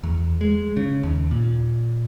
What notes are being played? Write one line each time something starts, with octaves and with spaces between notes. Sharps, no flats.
E2
G#3
C#3
D#2
A#2